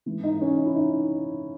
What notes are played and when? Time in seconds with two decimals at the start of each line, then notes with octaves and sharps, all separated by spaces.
0.06 G#2 E3
0.24 D#4
0.42 C#4
0.58 D#4
0.66 E4
0.74 D#4